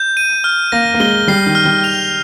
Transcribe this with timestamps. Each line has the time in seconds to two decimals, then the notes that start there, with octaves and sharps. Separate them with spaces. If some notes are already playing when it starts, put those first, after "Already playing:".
Already playing: G6
0.17 D#7
0.44 F6
0.72 A#3 A#6
0.94 A#3
1.00 G#3 G7
1.28 G3 C7
1.46 D#3
1.55 F6
1.65 G3
1.84 F7